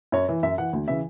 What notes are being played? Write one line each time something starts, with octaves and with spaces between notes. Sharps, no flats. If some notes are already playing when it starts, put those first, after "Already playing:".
F#2 C#5
E3
F#2 E5
E3 F#5
D2
C#3 E3 E5